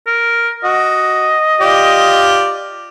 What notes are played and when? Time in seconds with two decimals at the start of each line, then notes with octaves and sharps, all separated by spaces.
0.07 A#4
0.64 F#4 D#5
1.61 F4 G4 D5